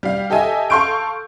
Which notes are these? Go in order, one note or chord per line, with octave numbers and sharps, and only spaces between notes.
G3 F5
G4 A4 D#5 E5 G#5
A4 F5 C6 C#6 G6 D7